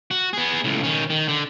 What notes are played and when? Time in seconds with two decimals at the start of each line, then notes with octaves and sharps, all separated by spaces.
0.11 F#4
0.33 B3 G#4
0.64 C#2 A2
0.83 D#3 C#4
1.10 D#3
1.28 D3